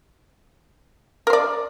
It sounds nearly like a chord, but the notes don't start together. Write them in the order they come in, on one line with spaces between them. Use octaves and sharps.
A#4 C5 D5